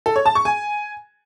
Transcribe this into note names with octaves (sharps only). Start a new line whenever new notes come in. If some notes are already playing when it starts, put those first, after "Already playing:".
A4
C#5
A5
C#6
G#5